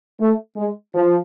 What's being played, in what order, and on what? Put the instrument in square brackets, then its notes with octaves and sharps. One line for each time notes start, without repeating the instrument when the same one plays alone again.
[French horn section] A3
G#3
F3